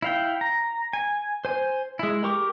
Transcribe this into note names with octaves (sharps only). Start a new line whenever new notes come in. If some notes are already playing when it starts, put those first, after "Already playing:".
E4 F5 G5
A#5
G#5
C5 G#5
G#3 E4
G4 A#4 C#6 D6